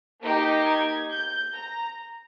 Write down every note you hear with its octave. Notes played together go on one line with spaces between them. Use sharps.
A#3 D#4 G4
G#6
G6
A#5